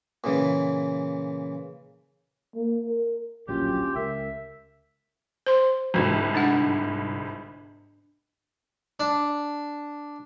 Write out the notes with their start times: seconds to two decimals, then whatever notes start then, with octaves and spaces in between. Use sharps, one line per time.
0.24 A#2 C#3 E3
2.55 A#3
2.89 A#4
3.48 D1 A#1 F#3 C#4 F4 G4 G5
3.95 C#2 A#4 E5
5.46 C5 C6
5.94 G1 C2 G#2 F#4
6.34 D4 F#5
9.00 D4